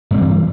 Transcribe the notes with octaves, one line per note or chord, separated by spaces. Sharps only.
G2 E3 G3 C4